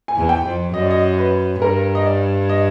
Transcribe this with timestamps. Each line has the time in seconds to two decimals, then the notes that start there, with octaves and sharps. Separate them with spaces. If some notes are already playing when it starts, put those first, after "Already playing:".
0.08 G#5
0.16 E2
0.29 G5
0.44 F2
0.73 F#2 D#5
0.82 D5
0.91 D#5
1.18 B4
1.61 G2 A#4
1.95 D#5
2.06 D5
2.49 D#5